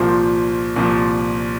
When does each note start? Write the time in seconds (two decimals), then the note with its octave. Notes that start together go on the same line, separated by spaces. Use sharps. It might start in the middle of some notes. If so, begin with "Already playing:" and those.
Already playing: C2 A#2 F3 C5
0.76 C2 A#2 F3